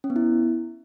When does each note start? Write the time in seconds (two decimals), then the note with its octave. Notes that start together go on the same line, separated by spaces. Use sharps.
0.04 C#4
0.10 B3
0.16 E4